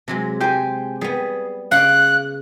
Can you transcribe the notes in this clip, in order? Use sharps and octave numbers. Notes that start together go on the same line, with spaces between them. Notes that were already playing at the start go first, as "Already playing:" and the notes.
C3 F#3 G#3
G#3 G4 C5 G#5
G3 B3 G#4
C#3 D5 F5 F#6